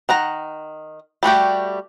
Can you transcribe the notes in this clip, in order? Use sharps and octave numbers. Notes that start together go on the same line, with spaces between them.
D#3 F#5 A#5
G3 A3 F#4 G4